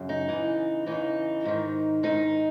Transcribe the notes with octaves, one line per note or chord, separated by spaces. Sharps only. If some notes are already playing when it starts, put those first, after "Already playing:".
Already playing: F#2 C#3
D#4
E2 C#3 E3
E2 C#3 E3 D#4
G#2 D#3
G#2 D#3 D#4